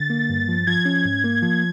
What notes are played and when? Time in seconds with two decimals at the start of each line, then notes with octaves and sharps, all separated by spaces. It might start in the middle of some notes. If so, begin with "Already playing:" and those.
Already playing: D3 A6
0.10 A#3
0.30 G2
0.49 F3
0.67 F3 G#6
0.85 C#4
1.05 G#2
1.24 A#3
1.42 F3